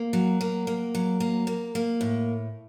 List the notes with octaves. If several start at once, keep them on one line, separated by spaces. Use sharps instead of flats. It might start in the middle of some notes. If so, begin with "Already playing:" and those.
Already playing: A#3
F#3
A#3
A#3
F#3
A#3
A#3
A#3
A2